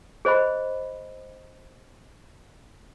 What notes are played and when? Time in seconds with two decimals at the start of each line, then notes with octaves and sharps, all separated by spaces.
0.25 G#4 C5 D#5 B5